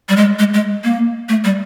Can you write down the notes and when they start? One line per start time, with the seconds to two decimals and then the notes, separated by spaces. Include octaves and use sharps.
0.09 G3
0.16 G#3
0.39 G#3
0.54 G#3
0.84 A#3
1.29 A3
1.44 G3